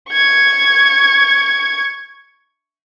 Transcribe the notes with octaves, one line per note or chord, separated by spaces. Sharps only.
C#6 G#6